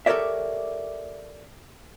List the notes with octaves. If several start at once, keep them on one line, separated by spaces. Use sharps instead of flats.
G4 A4 A#4 C#5 D5 E5